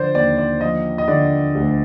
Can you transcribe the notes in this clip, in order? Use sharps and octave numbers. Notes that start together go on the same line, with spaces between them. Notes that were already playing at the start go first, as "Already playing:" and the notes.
Already playing: D3 F3 C5 D5
D#2 D5
D5
F3 D#5
D#5
D3 D5
D2